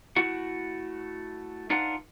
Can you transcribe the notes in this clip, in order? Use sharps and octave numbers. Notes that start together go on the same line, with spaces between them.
A3 E4 F#4 F#5
D4 D#4 F4 B4 F#5